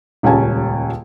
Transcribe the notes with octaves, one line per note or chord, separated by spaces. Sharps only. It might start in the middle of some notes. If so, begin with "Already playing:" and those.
D#1 C#2 G3 C#4 G#5 A5